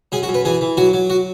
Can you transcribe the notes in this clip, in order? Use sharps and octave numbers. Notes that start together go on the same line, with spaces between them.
F#2 G#4
F#4
F#2
B4
E3 G#4
E3
F#3 F#4
F#3
F#4